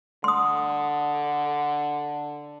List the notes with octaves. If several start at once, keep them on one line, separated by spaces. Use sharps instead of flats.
D3 C6 D#6